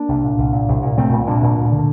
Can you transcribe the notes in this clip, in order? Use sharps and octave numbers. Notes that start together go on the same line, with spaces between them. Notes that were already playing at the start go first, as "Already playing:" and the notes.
Already playing: A#3 D4
C2
A#2
C2
A#2
C2
A#2
C2 A3 C4
A#2
C2 A#3 D4
A#2
D2
D3